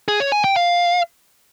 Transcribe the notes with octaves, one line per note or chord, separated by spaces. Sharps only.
G#4
C#5
G#5
G5
F5